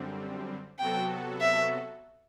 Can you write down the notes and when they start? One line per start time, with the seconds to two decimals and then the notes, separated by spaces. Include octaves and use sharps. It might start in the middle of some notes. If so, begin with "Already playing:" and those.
Already playing: F#2 D3 G3 C4
0.79 C3 F#3 B3 F#4 A4 G5
1.41 E5